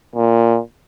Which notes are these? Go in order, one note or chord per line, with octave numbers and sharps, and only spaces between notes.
A#2